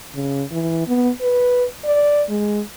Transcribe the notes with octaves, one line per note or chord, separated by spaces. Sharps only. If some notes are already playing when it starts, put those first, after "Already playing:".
C#3
E3
B3
B4
D5
G#3